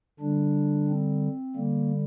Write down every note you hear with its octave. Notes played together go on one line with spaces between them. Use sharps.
D3 G3 D4
C4
D3 G3 A#3